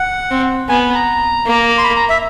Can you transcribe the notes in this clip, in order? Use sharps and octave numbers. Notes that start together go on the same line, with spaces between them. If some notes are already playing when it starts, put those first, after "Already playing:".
Already playing: F#5
C4
B3 G#5
A#5
A#3
C6
B5
A#5
E5